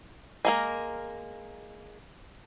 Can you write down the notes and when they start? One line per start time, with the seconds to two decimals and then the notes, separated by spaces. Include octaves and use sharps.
0.45 G#3 A#3 A#4